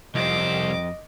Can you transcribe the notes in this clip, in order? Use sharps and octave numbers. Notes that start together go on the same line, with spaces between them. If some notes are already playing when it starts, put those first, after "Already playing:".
C2 F2 F3 C5 D#5 D6